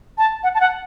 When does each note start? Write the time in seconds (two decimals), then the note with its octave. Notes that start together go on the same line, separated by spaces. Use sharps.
0.18 A5
0.43 F#5
0.55 A5
0.61 F#5